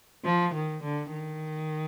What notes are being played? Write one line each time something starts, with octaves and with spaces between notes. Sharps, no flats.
F3
D#3
D3
D#3